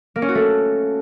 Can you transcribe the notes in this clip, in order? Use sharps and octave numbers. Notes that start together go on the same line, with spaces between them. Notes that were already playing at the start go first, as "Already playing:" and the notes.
A#3
C#4
F#4
A3